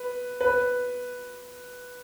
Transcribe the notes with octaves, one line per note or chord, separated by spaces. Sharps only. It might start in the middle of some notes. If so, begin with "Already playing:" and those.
Already playing: B4
B4